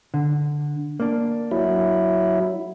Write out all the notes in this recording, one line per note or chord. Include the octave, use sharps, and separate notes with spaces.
D3
A#3 D4
F#3 E4